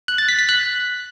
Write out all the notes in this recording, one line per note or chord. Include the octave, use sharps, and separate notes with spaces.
F#6
A6
B6
B6
F#6